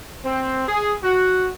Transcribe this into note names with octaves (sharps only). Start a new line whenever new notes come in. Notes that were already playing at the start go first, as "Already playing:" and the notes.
C4
G#4
F#4